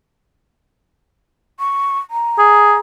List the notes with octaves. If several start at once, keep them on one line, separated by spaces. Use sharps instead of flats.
C#6
A#5
G#4